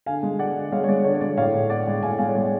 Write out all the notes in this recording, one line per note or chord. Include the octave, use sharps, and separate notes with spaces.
D3 F5 G#5
G#3
D3 D5 F#5
D3
G#3 C#5 F5
C#5
G#3 D5
D3 C#5
C#5
G#3 D5
A2 C#5 F5
A2
B3 D5 F#5
G#3
A2 F5 G#5
G#3 F5 G#5
C#5
G#3 D5